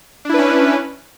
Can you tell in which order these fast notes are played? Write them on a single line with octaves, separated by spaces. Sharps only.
D4 E4 B4 C#4